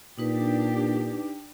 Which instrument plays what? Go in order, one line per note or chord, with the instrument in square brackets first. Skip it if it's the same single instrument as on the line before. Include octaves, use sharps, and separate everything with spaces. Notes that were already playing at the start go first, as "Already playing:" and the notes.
[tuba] A#2 [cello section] D4 G4 [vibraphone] D#4 B4